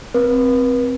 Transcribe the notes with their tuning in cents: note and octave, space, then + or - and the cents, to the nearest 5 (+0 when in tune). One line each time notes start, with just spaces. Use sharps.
C4 +0 B4 -40